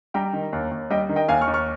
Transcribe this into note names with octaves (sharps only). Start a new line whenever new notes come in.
G3 G5 A#5
D#3
D#2
D#2
G3 D#5 G5
D#3
D#5 G5
D#2 F5 G#5
C#6 F6
D#2
C#6 F6